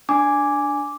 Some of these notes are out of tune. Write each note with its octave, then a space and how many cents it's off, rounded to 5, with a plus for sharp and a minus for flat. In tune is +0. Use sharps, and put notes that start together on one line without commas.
D4 +0 G#5 +0 D6 -5